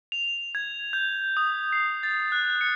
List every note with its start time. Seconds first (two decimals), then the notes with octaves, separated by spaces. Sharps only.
0.12 F7
0.55 G#6
0.93 G6
1.37 D#6
1.73 C7
2.03 A6
2.32 F#6
2.61 C#7